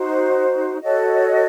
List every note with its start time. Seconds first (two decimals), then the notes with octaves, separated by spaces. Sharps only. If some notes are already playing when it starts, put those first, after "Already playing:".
Already playing: D#4 F#4 C5
0.80 F#4 A4 C#5 D#5